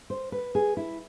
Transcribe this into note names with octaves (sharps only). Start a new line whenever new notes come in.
C5
B4
G#4
E4